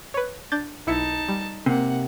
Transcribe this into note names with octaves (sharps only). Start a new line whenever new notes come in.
B4 C#5
D4 G6 A6
B1 D#4 E4 A5 C#7
G3
C3 A#3 F#5